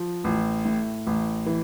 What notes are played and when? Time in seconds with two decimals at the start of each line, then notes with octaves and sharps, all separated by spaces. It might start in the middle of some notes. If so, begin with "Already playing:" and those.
Already playing: F3
0.24 A1
0.65 A2
1.07 A1
1.46 E3